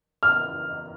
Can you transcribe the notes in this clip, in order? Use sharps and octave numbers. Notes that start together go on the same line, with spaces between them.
F6